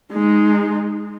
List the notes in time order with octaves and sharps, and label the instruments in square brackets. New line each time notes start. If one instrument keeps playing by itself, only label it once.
[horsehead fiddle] G#3 D#4